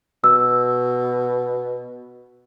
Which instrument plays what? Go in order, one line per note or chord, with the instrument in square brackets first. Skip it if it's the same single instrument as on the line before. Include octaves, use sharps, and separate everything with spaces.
[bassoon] B2 [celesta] E6